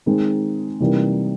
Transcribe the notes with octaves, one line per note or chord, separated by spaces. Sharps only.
D#3 G#3 C4 D#4
C3 E3 G3 A#3 D#4